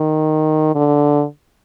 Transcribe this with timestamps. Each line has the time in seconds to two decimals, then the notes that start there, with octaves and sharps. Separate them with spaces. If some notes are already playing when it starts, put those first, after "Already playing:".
Already playing: D#3
0.75 D3